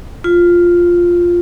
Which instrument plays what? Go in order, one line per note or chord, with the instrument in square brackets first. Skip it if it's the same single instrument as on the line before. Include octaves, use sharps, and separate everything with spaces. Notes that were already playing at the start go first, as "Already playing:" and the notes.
[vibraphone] F4